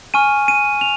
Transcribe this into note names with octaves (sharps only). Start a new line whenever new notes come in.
G#5 C#6 F6 D#7
D#7
F7